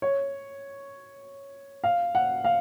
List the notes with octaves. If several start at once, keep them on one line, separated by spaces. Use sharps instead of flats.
C#5
F5
F#5
F5